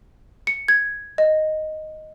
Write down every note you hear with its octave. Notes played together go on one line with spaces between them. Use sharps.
C#7
G#6
D#5